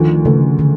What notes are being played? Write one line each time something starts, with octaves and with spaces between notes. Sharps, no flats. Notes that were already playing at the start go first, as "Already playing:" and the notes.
Already playing: D2 D#3 F3
C#3 A3
D3